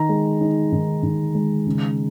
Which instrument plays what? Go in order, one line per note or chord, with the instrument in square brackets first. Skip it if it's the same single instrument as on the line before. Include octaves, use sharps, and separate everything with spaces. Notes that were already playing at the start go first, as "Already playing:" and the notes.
Already playing: [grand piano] D#3 A#5
G#3
D#4
D#3
D#3
G#3
C#3